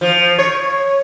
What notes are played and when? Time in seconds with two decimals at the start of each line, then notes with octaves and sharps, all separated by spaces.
0.01 F3
0.39 C#5